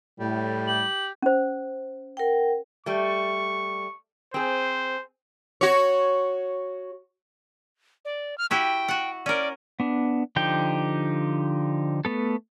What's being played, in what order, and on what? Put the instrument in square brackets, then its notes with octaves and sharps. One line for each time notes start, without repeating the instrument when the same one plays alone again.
[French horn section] A2 [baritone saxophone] G3
[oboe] G4 [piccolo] F#7
[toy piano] C#4 C5
[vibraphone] A#4 F#5 G5
[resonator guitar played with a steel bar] G3 A3 [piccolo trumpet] C#6
[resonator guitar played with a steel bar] C4 G#4 [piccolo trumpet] C5
[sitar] F#4 C#5
[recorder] D5
F6
[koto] E4 F#4 G4 [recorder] G5
[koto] F#4 F#5
[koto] C#4 A#4 [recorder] D5
[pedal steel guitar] B3 D4
D3 F3 D#4 G4 G5
A3 B3 A4